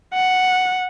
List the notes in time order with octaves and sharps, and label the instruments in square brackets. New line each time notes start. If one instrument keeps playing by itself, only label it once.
[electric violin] F#5